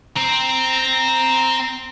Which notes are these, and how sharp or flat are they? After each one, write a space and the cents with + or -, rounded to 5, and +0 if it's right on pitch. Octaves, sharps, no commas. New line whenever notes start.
C4 +0 A#5 +0